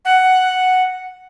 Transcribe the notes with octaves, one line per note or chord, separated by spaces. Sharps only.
F#5